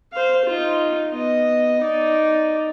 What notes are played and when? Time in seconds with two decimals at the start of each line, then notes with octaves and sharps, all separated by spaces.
0.13 C5 F5
0.46 D#4 F4
1.12 B3 D#5
1.81 D#4 D5